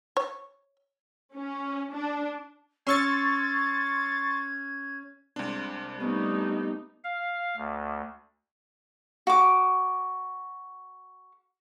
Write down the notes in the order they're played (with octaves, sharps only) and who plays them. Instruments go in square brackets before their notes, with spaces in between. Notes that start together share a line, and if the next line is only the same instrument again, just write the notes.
[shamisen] C#5
[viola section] C#4
D4
[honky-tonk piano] C#4 E6 [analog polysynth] C6 C#6 A6 [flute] G#6
[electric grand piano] C2 D4 [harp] C3 G#3
[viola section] G3 A3 D#4 [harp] B3 C#4 B4
[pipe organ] F5
D2
[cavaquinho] F#4 D6